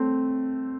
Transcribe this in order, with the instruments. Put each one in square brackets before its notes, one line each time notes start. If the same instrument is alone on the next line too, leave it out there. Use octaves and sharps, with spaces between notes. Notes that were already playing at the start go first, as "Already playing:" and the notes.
Already playing: [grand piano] A3 C4